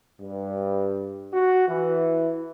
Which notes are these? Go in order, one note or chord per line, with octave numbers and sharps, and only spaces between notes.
G2
F#4
E3